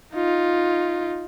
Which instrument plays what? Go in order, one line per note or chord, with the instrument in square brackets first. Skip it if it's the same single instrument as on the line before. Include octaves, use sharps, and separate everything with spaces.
[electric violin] D#4 F4